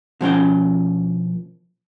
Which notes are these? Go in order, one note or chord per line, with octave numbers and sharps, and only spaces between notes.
B2 F3 C#4 G5